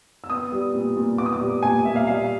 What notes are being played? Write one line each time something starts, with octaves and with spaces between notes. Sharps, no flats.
E6
B3 D#6
G3
A#2
A#2
B3 D6
D#6
D6
G3
A#2 G#5
A#2 E5
F5
G3 F5